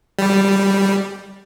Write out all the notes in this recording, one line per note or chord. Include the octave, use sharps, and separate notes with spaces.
G3